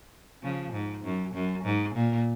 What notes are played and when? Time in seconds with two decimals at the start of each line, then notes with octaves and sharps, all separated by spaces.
0.42 C#3 F3
0.73 G#2
1.04 F#2
1.34 F#2
1.64 G#2
1.95 A#2